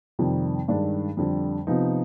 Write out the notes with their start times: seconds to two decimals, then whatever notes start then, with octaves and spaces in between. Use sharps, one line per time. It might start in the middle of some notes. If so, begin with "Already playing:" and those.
0.19 F2 C3 D#3 G3
0.68 G2 D#3 G#3 D4
1.17 F2 D3 G3
1.67 C3 F3 B3 D#4